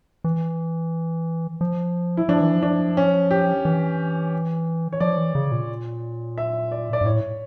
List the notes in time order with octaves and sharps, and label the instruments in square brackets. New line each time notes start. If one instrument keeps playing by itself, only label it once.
[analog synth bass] E3
F3
[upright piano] E4
[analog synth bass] F3 [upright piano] D4
[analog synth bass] E3
F3
[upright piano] D4
C#4
G4
[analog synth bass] E3
[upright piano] C#5
[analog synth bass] F3 [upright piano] D5
[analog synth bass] E3
C#3
A#2
[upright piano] E5
D5
D5
[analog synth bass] G2
[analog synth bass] A2 [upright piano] C#5